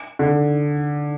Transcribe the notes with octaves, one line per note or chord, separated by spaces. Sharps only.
D3